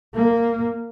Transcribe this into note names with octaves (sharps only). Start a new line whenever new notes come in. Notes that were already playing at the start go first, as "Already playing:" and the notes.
A#3